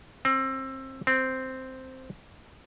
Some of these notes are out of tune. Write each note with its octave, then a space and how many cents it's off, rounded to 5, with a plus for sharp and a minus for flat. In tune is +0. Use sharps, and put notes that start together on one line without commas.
C4 +25
C4 -5